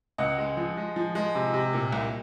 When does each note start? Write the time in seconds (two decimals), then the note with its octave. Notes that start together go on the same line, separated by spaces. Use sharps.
0.18 C#2 D#5 F#5
0.38 G#3
0.57 F3
0.77 G#3
0.96 F3
1.15 G#3
1.35 C3
1.53 C3
1.73 A#2
1.93 C2